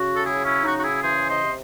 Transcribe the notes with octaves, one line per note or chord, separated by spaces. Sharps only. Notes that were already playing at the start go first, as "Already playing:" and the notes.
Already playing: C#3 F#4
A4
F#3 E4 G#4
C#4 E4
C#3 D#4 F#4
F#4
E4 G#4
E3 G#4 C5
C5 D#5
C3